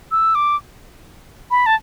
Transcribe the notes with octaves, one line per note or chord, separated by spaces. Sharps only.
E6
D6
B5
A5